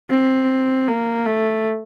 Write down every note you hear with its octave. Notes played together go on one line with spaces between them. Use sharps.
C4
A#3
A3